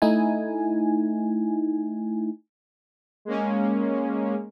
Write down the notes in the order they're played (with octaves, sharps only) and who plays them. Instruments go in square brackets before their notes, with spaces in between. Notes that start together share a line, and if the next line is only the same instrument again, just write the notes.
[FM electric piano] A3 D#4 E4 G#5
[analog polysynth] G#3 A#3 C#4